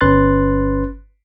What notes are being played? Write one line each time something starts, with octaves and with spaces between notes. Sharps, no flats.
G1 C#4 B4 C6 F#6 A6